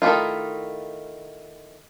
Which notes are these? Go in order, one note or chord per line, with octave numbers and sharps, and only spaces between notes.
D#3 A3 D4 E4 F4